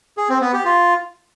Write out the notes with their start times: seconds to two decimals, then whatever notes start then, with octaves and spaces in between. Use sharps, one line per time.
0.17 G#4
0.29 C4
0.41 B3
0.53 G4
0.65 F4